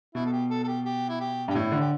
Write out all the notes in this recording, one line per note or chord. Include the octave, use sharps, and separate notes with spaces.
B2 E4
A4
G4
A4
A4
G4
G4
E4
G4
G2 G4
A2 E4
D3
G4